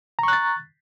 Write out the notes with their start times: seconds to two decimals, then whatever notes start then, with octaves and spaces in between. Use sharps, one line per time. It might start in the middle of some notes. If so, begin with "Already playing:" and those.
0.19 A#5
0.23 C#6
0.28 F#6
0.33 A6